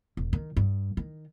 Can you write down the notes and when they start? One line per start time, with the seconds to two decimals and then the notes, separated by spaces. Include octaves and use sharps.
0.17 E1
0.33 D#3
0.57 G2
0.97 D#3